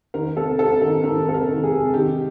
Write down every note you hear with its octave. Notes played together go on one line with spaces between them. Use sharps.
D#3 A#4
C3 A4
C3 A4
D#3 A#4
D#3 A#4
C3 A4
A#4
D#3
G#4
C3
D#3 G4